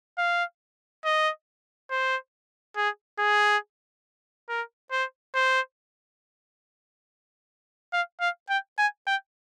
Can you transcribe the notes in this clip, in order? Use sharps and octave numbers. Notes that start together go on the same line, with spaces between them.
F5
D#5
C5
G#4
G#4
A#4
C5
C5
F5
F5
G5
G#5
G5